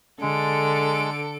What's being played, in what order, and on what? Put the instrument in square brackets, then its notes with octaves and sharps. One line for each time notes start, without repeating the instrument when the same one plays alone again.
[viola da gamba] D3 [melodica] G#3 [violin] A4 D7